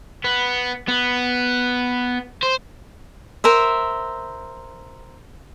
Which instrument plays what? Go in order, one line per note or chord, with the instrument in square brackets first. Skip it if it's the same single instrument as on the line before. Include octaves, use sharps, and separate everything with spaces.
[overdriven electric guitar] B3
B3
C5
[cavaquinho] A#4 C5 E5